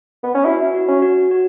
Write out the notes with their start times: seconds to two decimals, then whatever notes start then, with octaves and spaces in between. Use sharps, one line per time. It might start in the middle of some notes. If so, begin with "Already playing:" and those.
0.23 B3
0.35 C#4
0.45 E4 F#4
0.75 F#4
0.88 C#4
1.02 F#4
1.31 F#4